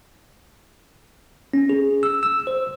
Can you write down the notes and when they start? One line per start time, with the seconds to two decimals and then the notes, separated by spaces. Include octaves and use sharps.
1.54 C#4
1.69 G#4
2.03 E6
2.23 E6
2.47 C5